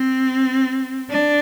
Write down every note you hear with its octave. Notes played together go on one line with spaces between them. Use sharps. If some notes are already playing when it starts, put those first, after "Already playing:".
Already playing: C4
D4